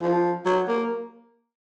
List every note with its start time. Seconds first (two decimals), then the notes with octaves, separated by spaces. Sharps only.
0.02 F3
0.46 F#3
0.68 A#3